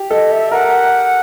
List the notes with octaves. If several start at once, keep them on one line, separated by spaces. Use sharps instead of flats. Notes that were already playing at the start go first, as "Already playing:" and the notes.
Already playing: G4
A4 D#5
E5
A#4 F#5